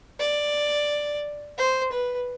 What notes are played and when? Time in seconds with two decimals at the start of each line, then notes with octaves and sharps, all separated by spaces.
0.20 D5
1.58 C5
1.92 B4